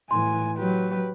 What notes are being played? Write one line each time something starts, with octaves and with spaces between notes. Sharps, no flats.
A2 E3 G#5 C6
F#3 G4 B4